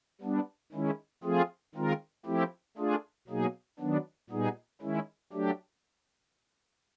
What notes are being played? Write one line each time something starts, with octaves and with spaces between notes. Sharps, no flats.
G3 B3 D4
D#3 G#3 C#4 E4
F3 A3 C4 F4 G#4
D#3 G#3 C4 F4 A#4
F3 A3 C4 E4 G4
A3 D4 F4 G#4
B2 F#3 A#3 D#4 G#4
D#3 F#3 B3 D4
A#2 G3 B3 D#4 G#4
D#3 G#3 C#4 E4
F#3 A3 D4 G4